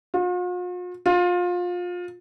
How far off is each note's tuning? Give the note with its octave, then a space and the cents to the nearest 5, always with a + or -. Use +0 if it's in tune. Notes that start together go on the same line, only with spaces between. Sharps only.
F4 +45
F4 +25